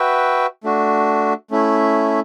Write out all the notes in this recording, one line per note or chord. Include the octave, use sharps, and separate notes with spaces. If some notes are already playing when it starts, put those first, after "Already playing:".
Already playing: F#4 B4 E5 G5
A3 D4 F#4
A3 C#4 E4